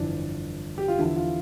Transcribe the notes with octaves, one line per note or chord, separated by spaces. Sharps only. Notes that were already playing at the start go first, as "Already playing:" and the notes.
Already playing: G1 F2 E3 D4
G4
F4
E2 D3 F3 E4
F4